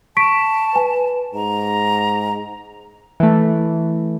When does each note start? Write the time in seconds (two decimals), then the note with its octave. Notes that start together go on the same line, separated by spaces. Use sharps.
0.17 A5 C#6 B6 D7
0.76 B4 G#5
1.35 G#2 A#5
3.20 E3 A3